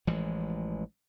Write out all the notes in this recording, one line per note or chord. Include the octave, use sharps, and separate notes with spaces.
A1 E3 F3 G#3